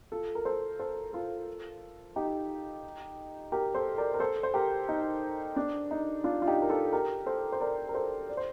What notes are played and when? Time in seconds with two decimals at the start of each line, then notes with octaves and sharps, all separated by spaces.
0.12 F4 A4
0.35 A#4
0.45 A4 C5
0.79 A4 C5
1.13 F4 A4
2.16 D#4 G4
3.52 G4 A#4
3.75 A4 C5
3.98 A#4 D5
4.14 A#4
4.20 A4 C5
4.43 C5
4.54 G4 A#4
4.88 D#4
5.56 D4
5.91 D#4
6.24 D4 F4
6.42 F4
6.47 D#4 G4
6.62 A#4
6.69 F4 A4
6.93 G4 A#4
7.26 A4 C5
7.52 C5
7.61 A#4 D5
7.89 A#4
7.94 A4 C5
8.29 D5
8.37 C5